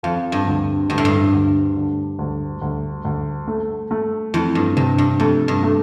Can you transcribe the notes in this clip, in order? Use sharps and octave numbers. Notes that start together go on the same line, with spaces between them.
F2 F3
G2
D2
D2 G2
A2
G2
D2
D3
D2
D2
D2
A3
A3
F2 E3
G2
G2 C3
G2
F2 A3
G2
A3